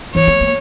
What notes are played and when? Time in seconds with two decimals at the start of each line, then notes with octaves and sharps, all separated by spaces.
0.14 E3 C#5
0.27 G#3
0.41 A#3